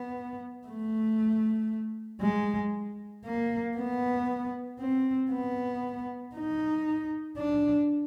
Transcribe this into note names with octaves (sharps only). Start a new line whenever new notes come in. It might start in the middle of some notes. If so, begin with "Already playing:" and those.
Already playing: B3
A3
G#3
A#3
B3
C4
B3
D#4
D4